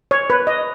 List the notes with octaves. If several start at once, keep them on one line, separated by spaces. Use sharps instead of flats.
C#5
B4
D#5